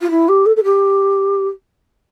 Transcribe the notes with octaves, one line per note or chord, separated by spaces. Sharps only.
F4
E4
G4
A4
A4
G4